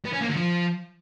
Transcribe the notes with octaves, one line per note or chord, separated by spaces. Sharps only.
B3
C#4
A#3
D3
F3